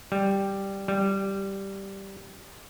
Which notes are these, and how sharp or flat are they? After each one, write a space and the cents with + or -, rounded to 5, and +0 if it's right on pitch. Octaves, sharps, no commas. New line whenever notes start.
G3 +0
G3 -5